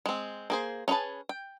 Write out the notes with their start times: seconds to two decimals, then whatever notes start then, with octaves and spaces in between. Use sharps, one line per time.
0.06 G#3 C4
0.50 A#3 G#4 C5
0.88 C#4 D#4 G#4 B4 A5
1.29 G5